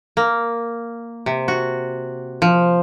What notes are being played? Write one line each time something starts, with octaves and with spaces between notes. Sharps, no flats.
A#3
C3
F#4
F3